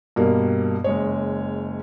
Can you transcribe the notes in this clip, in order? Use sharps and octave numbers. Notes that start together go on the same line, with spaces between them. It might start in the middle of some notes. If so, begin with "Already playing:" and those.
G2 B2 G3 A#3
F#1 G#3 C#5